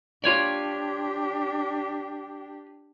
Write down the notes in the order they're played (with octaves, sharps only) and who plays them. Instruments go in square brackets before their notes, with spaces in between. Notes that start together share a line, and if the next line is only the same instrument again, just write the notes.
[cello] D4 G4 [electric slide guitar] F4 C#5 D5